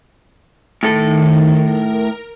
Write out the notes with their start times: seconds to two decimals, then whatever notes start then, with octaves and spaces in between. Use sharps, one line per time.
0.83 A2 D#3 A4
1.54 A#4